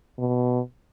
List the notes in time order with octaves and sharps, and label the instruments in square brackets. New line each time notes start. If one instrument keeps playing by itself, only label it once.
[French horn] B2